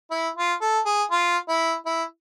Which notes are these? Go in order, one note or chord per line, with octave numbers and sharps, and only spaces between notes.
E4
F4
A4
G#4
F4
E4
E4